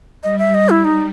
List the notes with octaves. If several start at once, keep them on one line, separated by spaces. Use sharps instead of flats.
G3 D#5
E5
D#5
E4
D#4